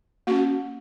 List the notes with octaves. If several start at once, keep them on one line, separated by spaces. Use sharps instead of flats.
A#3 C#4 F#4